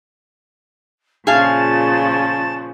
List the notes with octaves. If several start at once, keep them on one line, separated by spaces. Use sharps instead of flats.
A#2 C#3 F3 G#4 F5 A5